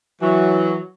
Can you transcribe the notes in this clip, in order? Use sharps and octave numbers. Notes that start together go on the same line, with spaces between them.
E3 F#3